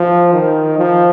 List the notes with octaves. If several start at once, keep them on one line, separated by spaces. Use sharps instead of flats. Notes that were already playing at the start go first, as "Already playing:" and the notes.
Already playing: F3
D#3
F3